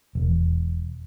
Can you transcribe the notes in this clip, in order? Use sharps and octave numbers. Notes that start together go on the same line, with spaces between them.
E1